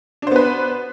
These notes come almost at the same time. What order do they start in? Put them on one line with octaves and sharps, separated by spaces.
D4 C5 B3 B4